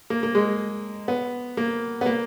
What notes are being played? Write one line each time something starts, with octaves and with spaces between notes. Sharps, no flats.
A#3
A#3
G#3
B3
A#3
B3
A#3